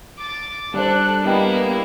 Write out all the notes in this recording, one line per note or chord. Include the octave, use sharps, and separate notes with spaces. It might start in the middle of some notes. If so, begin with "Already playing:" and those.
D6 A6
G3 D4 A4 C5 F#6
G3 A#3 B3 E4 D#5 G5